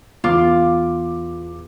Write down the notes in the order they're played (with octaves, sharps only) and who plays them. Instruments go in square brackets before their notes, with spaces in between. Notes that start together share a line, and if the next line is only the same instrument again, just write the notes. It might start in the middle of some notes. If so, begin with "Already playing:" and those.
[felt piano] E2 D6 [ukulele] F4